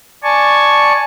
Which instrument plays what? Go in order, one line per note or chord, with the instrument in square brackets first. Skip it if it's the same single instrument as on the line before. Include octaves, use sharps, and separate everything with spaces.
[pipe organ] D5 G#5 A5 C#6